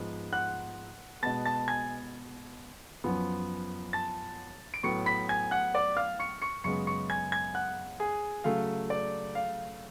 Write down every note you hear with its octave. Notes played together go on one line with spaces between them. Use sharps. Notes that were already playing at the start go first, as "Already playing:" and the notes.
Already playing: G#2 F3 B3
F#5 F#6
B2 G#3 B3 A5 A6
A5 A6
G#5 G#6
F#2 F3 B3
A5 A6
D7
A2 F#3 B3 C#6 C#7
B5 B6
G#5 G#6
F#5 F#6
D5 D6
F5 F6
C#6 C#7
C#6 C#7
F#2 C#3 G#3 B3 C#6 C#7
C#6 C#7
G#5 G#6
G#5 G#6
F#5 F#6
G#4 G#5
C#3 F#3 A3 F5
D5
F5